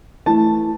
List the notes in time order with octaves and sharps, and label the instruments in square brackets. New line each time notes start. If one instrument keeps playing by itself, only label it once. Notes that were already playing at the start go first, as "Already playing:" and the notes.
[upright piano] E3 A3 A5